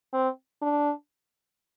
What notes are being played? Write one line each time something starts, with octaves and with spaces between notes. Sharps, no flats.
C4
D4